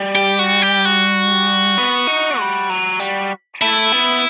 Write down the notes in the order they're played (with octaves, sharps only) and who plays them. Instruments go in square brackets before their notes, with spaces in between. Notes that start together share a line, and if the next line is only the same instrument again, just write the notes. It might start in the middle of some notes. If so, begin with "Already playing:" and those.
Already playing: [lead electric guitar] G3
[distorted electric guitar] G4
F#4
G4
F#4
[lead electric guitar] B3
D#4
G3
F#3
G3
[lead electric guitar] A3 [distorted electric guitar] E4
[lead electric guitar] B3